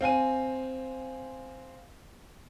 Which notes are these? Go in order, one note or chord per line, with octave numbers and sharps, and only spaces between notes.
C4 F5 G#5 D#7